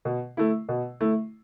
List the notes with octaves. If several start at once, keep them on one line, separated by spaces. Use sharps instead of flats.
B2
A3 E4
B2
A3 E4